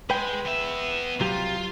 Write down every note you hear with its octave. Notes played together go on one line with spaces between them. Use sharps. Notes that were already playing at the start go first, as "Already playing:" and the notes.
G#3 B4 G5
B3 E5
C2 F#3 F4 G4